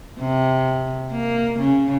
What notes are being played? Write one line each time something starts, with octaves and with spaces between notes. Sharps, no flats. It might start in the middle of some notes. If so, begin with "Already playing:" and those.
C3
A#3
C#3